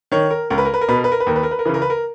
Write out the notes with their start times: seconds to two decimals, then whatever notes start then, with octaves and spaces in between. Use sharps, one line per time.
0.12 D#3 C#5
0.31 A#4
0.50 C#2 A#4
0.58 B4
0.65 A#4
0.74 B4
0.81 A#4
0.88 B2 B4
0.97 A#4
1.04 B4
1.12 A#4
1.20 B4
1.27 D#2 A#4
1.36 B4
1.43 A#4
1.51 B4
1.59 A#4
1.65 C#3 E3 B4
1.74 A#4
1.82 B4
1.90 A#4